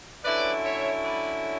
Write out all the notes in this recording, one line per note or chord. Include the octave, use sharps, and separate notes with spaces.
D3 F#3 C#4 E4 B4 D5
C#5 E5
B4 D5